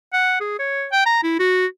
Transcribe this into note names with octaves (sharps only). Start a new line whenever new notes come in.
F#5
G#4
C#5
G5
A#5
E4
F#4